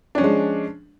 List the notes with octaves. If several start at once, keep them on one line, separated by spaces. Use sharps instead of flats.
F3 G#3 C#4 D4